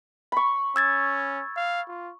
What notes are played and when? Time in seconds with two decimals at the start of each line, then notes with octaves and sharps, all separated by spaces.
0.32 B5 C#6
0.76 C#4 E6 G#6 A6
1.57 F5
1.88 F4